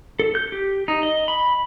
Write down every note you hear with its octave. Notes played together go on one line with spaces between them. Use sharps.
A4
G6
G4
D#4
D#5
B5